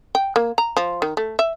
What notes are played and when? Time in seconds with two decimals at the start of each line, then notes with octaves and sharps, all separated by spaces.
0.15 G5
0.36 A#3
0.58 A#5
0.77 F3
1.02 D#3
1.17 A3
1.39 E5